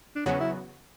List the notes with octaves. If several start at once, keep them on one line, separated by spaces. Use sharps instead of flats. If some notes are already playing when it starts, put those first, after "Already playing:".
D4
E2 C#3 F#3 B3 C#4 F#4
E4